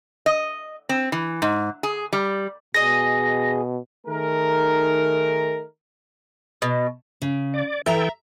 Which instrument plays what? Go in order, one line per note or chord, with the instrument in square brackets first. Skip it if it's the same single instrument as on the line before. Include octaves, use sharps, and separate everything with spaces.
[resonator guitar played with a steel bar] D#5
C4
E3
G#2
G#4
G3
[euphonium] B2 [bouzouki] G#4 D#5 [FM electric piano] A#6
[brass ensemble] D#3 A3 D#4 G#4 A#4
[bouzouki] B2
[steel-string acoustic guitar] C#3
[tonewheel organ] D5
[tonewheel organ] E3 A4 G5 [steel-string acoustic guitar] E5 A#5